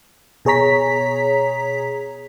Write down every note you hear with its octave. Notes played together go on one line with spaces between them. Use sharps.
B2 G#4 C#5 A#5 B6